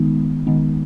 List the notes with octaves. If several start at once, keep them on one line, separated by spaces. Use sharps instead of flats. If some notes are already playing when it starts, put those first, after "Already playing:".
Already playing: D#3 G#3 B3 D#4
D#3 G#3 B3 D#4